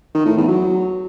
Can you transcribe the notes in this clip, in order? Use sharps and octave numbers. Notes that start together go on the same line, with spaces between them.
D#3
A2
E2
F#3